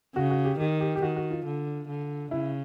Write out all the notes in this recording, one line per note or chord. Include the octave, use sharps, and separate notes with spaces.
C#3 F#4
F#4
G4
D#3 G4
G4
G4
D#3 F#4
F#4
F4
D3
D3
C#3 E4